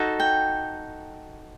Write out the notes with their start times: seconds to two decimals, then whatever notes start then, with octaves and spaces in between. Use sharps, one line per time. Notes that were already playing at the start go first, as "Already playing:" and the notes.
Already playing: D#4 F#4 A4
0.20 G5